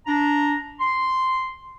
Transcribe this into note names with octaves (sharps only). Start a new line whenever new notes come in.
D4 A#5
C6